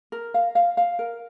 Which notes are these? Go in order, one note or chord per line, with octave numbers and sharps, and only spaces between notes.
A#4
F5
F5
F5
A#4